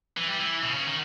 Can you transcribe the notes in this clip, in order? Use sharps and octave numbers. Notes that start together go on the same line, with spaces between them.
E3
G3
E3
B2
C#3
D#3